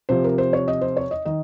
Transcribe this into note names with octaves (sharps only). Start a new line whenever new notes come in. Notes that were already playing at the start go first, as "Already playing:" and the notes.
C3 F3 C5
A#4
C5
C#5
D#5
C5
C#5
D#5
D#3 D#5